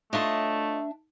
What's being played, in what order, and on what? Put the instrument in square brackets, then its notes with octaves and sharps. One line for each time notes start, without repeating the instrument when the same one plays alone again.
[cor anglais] A3 [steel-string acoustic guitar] D4 E5 A5 [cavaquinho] F4 C#5 D#5